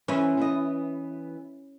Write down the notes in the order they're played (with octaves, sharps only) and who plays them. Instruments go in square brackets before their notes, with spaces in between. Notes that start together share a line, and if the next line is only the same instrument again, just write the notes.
[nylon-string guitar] E3 B3 C5 [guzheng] C#4 E4
[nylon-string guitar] E3 B3 D#5